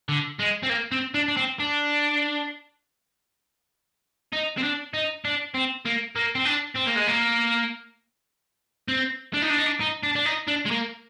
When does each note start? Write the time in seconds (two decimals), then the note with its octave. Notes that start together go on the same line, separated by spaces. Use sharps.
0.09 D3
0.39 G#3
0.63 C4
0.69 A#3
0.92 C4
1.14 D4
1.28 D4
1.37 C4
1.59 D4
4.33 D#4
4.58 C4
4.63 D4
4.94 D#4
5.25 D4
5.54 C4
5.85 A#3
6.16 A#3
6.35 C4
6.45 D4
6.76 C4
6.87 A#3
6.97 G#3
7.08 A#3
8.88 C4
9.34 D4
9.42 D#4
9.50 D4
9.58 D#4
9.66 D4
9.80 D#4
10.03 D4
10.16 D4
10.25 D#4
10.48 D4
10.66 G#3
10.71 A#3